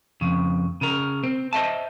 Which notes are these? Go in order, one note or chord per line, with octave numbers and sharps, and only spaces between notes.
F2 C#3
C#3 A#4
C4
C5 D#5 E5 A5